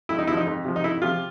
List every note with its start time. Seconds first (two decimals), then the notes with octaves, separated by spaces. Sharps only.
0.09 F2 E4
0.19 D#4
0.27 C3 F3 E4
0.37 D#4
0.46 F2
0.65 C3 F3
0.76 D#4
0.84 F2 E4
1.02 C3 F3 F4